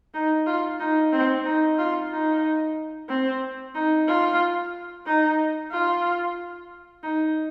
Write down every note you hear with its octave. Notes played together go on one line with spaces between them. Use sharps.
D#4
F4
D#4
C4
D#4
F4
D#4
C4
D#4
F4
D#4
F4
D#4